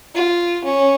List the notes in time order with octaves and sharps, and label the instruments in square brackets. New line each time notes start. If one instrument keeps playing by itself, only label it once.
[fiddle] F4
C#4